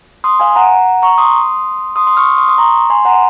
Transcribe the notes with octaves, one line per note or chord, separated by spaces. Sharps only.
C6 D#6
F5 G#5
F#5 A#5
A#5 C#6
C6 D#6
C6 D#6
C6 D#6
C#6 F6
C6 D#6
C6 D#6
A#5 C#6
G#5 C6
F#5 A#5